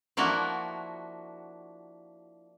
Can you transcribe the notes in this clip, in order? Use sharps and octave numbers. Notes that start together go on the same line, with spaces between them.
F3 A#3 D4 E4 F#4